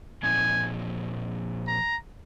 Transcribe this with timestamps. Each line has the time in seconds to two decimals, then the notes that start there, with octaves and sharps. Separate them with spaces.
0.23 A#2 F3 C4 D#4 G#5
1.67 A#5